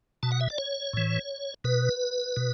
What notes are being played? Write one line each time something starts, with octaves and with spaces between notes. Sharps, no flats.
B2 A5
F#5
E5
D5
C#5
A2 E3
B2 B4
B2